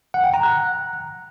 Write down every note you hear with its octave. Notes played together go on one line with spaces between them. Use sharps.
F#5
G5
A#5
F#6